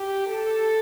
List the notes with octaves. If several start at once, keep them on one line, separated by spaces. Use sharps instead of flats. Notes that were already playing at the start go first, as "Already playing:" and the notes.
Already playing: G4
A4